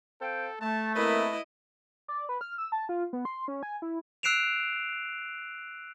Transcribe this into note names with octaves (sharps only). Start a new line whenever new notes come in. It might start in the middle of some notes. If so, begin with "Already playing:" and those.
C4 A4 F5 G5
A3 A5
A#3 C4 E4 A#4 B4 D#5
D5
B4
F6
E6
A5
F4
B3
C6
C#4
G#5
E4
E6 F#6 C7 D7 E7 F7